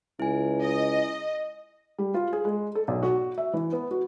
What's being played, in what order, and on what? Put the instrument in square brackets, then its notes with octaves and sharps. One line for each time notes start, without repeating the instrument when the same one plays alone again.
[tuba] C#2 [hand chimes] E4 G#5
[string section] D#5
[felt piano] G3
F4
G#4
G#3
A4
B1
F#4
E5
E3
B3
F#4